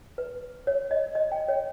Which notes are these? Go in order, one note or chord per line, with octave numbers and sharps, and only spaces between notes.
B4
C#5
D#5
D#5
G5
C#5